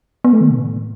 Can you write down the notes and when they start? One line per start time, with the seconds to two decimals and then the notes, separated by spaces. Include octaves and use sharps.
0.24 B3
0.33 A3
0.41 D#3
0.50 C3
0.57 A2